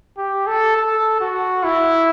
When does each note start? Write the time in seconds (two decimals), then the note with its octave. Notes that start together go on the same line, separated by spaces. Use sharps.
0.18 G4
0.47 A4
0.77 A4
1.21 F#4
1.64 E4